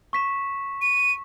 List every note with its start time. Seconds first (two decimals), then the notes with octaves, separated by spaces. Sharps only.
0.13 C#6 B6 E7
0.82 D#7